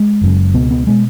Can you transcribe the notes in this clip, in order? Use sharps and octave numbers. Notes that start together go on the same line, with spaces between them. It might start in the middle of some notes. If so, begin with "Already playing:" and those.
Already playing: G#3
F#1 F#2 C#3
C#2 B2 B3
B3
B2 G#3